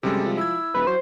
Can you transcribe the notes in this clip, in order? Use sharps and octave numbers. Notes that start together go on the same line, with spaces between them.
F#2 C3 G3 G#3 A4
F3
E4 E6 G#6
D#1 B4
F#3 C5